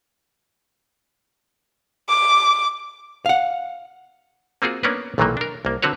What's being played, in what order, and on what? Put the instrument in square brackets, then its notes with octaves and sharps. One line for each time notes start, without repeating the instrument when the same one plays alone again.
[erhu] D6
[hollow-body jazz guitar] F5 F#5
[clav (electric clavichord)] A#3 C4 F4 F#4 G#4
A#3 B3 C#4 D4 A#4 B4
B1 A#2 D#3 E3 F#3 A#3
D4 A#4
C2 A#3
D3 C4 F#4 B4 C#5